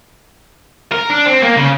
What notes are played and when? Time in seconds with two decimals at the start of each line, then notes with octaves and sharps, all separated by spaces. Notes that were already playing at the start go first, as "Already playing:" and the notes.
0.92 A#4
1.09 D4
1.26 C4
1.43 A#3
1.57 C#3